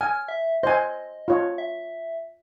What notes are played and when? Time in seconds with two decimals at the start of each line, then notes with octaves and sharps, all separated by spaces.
0.01 G#5 F6
0.28 E5
0.63 C5 D#5 G#5
1.28 F4 C#5
1.58 E5